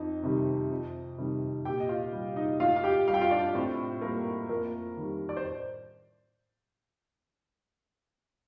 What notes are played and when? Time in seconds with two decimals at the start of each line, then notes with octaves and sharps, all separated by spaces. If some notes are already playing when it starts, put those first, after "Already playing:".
Already playing: F2 D#4
0.23 C3 D#3 G3
0.71 F2
1.18 C3 D#3 G3
1.65 A#2 G4 G5
1.80 D#5
1.89 F4 F5
2.13 G3
2.36 D#4 D#5
2.60 A2 F4 F5
2.76 F5
2.83 G4 G5
3.07 G3 F5
3.14 G5
3.22 F4 F5
3.31 D4 D5
3.55 A2 C4 C5
4.01 G3 A#3 A#4
4.49 F2 A#3 A#4
4.97 D#3 G3
5.29 D5
5.37 C5